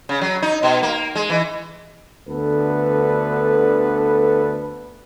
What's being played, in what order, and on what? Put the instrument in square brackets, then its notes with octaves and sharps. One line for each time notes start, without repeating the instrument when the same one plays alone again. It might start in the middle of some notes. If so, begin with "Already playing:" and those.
[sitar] C#3
F#3
D#4
B2
A#3
G#3
E3
[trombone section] D2 D3 B3 A4 B4